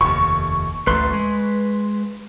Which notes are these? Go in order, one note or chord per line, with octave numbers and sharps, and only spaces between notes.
F1 D#2 C#6
A1 D2 A3 B4 C6
G#3